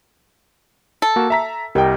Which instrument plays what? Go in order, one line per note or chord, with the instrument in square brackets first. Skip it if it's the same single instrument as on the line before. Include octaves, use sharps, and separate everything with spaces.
[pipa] A4
[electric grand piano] A#3 F#4
E5 A#5 B6
[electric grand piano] C2 G5 [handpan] G4 A#4 D#5